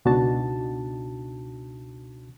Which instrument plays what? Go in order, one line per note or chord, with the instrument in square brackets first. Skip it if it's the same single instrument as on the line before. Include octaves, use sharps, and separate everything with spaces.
[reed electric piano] C#2 B2 D4 D#4 F#4 A5